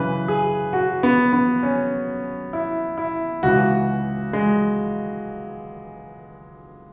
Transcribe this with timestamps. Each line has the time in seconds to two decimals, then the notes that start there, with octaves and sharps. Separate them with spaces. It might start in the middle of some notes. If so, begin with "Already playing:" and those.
Already playing: F#2 C#3 E3 B4
0.28 G#4
0.73 F#4
1.03 B3
1.33 B3
1.63 C#4
2.53 E4
2.98 E4
3.43 C#2 C#3 E3 F#4
4.33 G#3